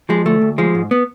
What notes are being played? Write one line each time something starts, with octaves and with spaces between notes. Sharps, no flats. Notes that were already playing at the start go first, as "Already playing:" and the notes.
F3 G#3
D2 A3
D2
F3 G#3
G#2
B3